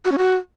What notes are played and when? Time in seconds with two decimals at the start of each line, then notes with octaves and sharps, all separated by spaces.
0.05 F#4
0.12 C#4
0.18 F#4